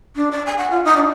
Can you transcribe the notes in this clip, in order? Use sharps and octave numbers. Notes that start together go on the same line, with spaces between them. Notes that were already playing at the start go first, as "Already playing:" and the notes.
D4
D5
G#5
F#5
F4
D#4
D4